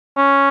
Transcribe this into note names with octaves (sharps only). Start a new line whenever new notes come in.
C#4